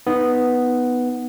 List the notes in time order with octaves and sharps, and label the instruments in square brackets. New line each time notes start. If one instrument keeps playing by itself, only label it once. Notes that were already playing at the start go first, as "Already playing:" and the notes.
[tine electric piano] B3 [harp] D#4